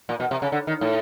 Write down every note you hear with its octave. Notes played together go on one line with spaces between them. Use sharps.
A#2
B2
C3
C#3
D3
D#3
A2